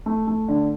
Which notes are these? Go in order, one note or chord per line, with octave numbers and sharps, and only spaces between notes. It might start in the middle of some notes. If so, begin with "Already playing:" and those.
A3
A3
D3